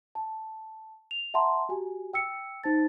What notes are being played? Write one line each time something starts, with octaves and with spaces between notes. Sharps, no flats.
A5
F7
E5 F#5 A5 A#5 C6
F#4 G4 G#5
G5 E6 C#7
D#4 C5 A5 A6